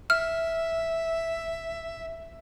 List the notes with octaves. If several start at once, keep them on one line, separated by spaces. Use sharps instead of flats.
E5 F6